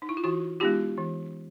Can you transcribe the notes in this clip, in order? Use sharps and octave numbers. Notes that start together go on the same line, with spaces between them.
D#4
E4
F4
E3 E4 F#4
G#3 B3 D#4 F4 G4
E3